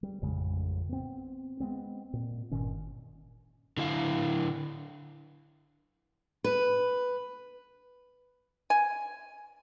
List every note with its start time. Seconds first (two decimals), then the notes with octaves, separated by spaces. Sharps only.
0.03 G3
0.22 A1 F2 C#3 G#3
0.89 B3 C4
1.60 G#3 B3 C4
2.13 A#2
2.51 G1 A#2 D#3 C#4
3.77 D3 E4 F5
6.44 B4
8.70 G#5